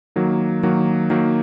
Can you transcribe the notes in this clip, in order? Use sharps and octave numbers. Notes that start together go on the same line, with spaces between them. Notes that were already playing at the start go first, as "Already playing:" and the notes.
D#3 F#3 A#3
D#3 F#3 A#3
D#3 F#3 A#3